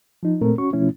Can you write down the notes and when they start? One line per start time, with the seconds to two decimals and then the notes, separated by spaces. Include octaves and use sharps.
0.23 F3 D#4
0.41 A#2 A3 C4 A#4
0.58 C#4 F#4 C#6
0.73 B2 F3 A3 C#4 E4